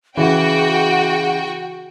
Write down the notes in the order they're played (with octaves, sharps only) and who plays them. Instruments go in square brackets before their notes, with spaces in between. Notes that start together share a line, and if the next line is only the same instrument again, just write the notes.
[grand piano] C#3 E3 [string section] F#4 G5 [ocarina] G#4